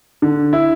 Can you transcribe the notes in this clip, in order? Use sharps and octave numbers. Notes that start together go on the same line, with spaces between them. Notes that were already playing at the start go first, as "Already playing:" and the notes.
D3
E4